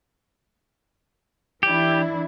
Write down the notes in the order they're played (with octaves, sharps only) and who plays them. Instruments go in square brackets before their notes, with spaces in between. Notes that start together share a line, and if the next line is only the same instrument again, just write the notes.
[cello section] E3 D4 E4 [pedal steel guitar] G4